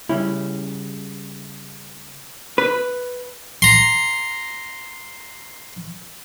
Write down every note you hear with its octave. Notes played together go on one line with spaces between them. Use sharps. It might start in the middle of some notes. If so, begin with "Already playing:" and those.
C#3 G3 C#4 E4
B4
A#5 C6